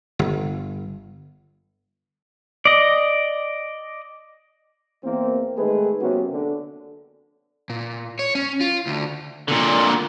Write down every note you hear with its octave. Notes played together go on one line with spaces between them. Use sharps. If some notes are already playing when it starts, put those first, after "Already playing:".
G1
D5 D#5
E2 A#3 C4
D#3 G#3 A3 G#4 B4
C3 F#3 A#3 B3 C#4 F#4
D3
A#2
C#5
C#4
F4
D2
A#2 D3